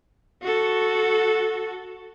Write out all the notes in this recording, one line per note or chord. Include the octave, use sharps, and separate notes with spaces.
F#4 A4